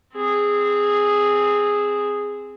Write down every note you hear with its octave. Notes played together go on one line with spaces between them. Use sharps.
C4 G#4